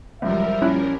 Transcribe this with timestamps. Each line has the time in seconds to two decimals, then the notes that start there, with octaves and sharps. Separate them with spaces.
0.22 C#2 F#2 F3 G3 A#4 E5
0.62 A#1 C#4 E4 F#6